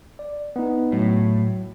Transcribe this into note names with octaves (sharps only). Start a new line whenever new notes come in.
D5
B3 D#4
A2 F#3